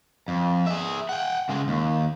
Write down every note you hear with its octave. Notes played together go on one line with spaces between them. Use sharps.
F2
G#4 E5
F#5 G5
C#3 G#3
D#2